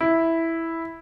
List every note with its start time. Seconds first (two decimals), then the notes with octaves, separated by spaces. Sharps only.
0.01 E4